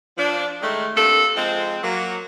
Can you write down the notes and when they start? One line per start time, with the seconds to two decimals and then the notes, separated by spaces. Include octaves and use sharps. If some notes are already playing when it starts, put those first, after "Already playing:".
0.18 F3 D4
0.62 D#3 G#3 A3
0.96 C3 A#3 D4 A4
1.36 F3 G#3 C4
1.83 F#3 A#3